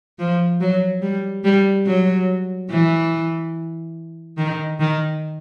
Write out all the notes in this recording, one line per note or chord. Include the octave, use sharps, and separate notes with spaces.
F3
F#3
G3
G3
F#3
E3
D#3
D#3